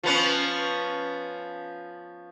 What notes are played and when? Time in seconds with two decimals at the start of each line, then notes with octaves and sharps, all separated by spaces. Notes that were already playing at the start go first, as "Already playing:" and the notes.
0.03 F3 B3 C#4